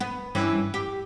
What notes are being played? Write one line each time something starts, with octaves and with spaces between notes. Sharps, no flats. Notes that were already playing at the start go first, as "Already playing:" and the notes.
B3
G2 E3 C#4
G4